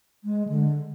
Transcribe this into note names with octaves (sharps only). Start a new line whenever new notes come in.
G#3
D3